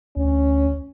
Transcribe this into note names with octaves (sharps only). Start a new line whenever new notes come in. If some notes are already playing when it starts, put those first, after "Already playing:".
D2 C#4